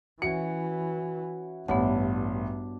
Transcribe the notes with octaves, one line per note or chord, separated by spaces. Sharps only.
E3 C#4 E4 F#4 C#7
A1 G2 B3 D4 C#5 F#5